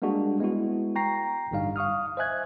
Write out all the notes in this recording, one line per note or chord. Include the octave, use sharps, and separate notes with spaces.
G3 G#3 A#3 D4 F#4 G#4
G#3 B3 E4 F#4
G5 A#5 C#6 A#6 C7
A1 G2 D3 G3 D#4 F5
F5 C#6 D#6 F6
C5 D#5 E5 G#5 F#6 G#6